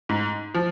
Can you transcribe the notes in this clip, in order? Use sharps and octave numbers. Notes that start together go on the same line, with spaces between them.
G#2
F3